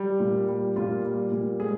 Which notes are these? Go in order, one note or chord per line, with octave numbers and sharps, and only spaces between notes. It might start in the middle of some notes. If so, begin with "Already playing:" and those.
Already playing: G3
A#2
G3
A#2 F4
G3
A#2
G#3 G#4